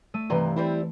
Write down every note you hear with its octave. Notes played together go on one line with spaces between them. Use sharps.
A3 E6 D#7
G2 C3 D#3 E3 C6
G3 C4 E4